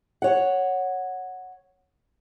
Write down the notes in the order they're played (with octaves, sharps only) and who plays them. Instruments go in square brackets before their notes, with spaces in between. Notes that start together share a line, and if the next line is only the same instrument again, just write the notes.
[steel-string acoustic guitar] C#5 F#5